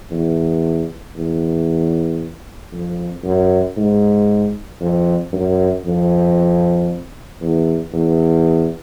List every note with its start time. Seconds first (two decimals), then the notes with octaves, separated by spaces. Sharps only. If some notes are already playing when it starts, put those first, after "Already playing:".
0.11 E2
1.16 E2
2.72 F2
3.23 F#2
3.77 G#2
4.80 F2
5.33 F#2
5.85 F2
7.41 E2
7.93 E2